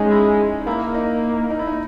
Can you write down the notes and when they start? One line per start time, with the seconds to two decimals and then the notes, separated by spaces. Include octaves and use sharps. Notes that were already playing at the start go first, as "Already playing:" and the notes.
Already playing: G#3 C#4 D#4
0.11 E4
0.62 D#4
0.66 A#3 E4
0.95 D#4
1.50 D#4
1.59 E4
1.67 D#4